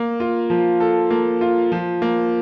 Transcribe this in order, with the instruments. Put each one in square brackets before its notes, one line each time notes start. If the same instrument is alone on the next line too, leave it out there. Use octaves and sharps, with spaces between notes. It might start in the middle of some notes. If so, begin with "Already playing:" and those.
Already playing: [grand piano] A#3
F4
F3
A4
A#3
F4
F3
A#3